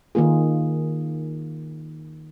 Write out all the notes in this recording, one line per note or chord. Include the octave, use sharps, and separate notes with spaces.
D#3 A#3 F4 G#4